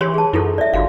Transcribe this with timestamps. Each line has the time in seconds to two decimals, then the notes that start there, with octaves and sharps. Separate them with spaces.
0.01 E3 G4 C#5 C6
0.14 G#4 A5
0.33 F#2 E4 F4 A4
0.58 D5 E5
0.74 G1 F4 F#4 F5